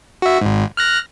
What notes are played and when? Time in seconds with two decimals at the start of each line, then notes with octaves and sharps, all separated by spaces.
0.22 F#4 E5
0.41 G#1 G#2
0.77 F6 F#6 A#6